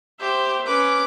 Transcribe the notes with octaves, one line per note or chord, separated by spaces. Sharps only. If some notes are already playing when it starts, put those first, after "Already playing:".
G4 C5 E5
C#4 B4 D6